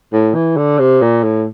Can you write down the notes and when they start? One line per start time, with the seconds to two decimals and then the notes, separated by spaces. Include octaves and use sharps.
0.13 A2
0.35 E3
0.57 D3
0.79 C3
1.01 A#2
1.23 A2